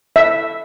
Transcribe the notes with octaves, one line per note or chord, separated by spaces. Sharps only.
E5